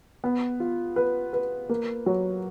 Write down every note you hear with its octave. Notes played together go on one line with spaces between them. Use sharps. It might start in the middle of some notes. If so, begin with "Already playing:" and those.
B3
F4
B4
B4
A#3
F#3